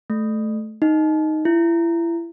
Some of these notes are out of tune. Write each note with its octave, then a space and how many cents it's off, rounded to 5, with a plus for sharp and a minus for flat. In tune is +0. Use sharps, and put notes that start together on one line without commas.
A3 -15
D#4 +0
E4 +30